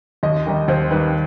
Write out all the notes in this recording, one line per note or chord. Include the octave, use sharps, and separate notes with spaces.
D#2 D#5
D#3 G3 D#4
D#2 C5
D#3 G3 D#4 B4